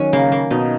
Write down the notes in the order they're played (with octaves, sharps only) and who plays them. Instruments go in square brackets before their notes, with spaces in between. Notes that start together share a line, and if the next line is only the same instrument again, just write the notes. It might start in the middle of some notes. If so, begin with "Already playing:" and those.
Already playing: [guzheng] D#3 F#3 C#4
[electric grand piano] C#3 [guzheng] A#3
[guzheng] A#3
[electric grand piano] B2 [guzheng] D#4